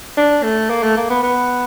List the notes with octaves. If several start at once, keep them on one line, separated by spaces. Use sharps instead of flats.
D4
A3
A#3
A3
A#3
B3
B3